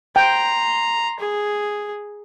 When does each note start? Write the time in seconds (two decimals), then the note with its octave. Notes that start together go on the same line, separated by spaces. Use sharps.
0.16 G5 A#5 C6
1.20 G#4